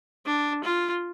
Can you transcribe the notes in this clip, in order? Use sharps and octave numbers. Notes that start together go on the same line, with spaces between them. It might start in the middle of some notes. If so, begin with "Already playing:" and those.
D4
F4